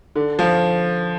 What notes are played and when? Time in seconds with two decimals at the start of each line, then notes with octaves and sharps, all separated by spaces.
0.16 D3
0.39 F3